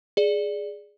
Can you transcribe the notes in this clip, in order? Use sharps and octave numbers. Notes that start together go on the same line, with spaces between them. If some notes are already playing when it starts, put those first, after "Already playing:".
G#4 D5